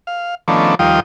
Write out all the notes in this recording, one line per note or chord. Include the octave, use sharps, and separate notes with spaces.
F5
D#3 F3 A3 B3 C#4 D4
D#2 F3 G3 F4 G5 D#6